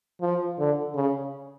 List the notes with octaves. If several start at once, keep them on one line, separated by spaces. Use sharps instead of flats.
F3
D3
C#3